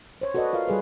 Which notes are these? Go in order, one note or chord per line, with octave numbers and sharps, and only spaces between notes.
C5 C#5
F#4 A4 B4 D5 D#5
F4 A#4 F5
G3 G#4 A4 B4